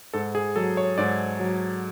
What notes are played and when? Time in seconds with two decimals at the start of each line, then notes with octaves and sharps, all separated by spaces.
0.14 G#2 A4
0.35 G#4
0.56 F#3 A4
0.77 C#5
0.98 G#2 D5
1.40 F#3